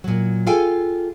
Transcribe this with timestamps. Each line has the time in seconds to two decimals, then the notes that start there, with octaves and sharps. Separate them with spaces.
0.04 A#2 F#3
0.47 F4 G#4 A4 F5 G5 G#5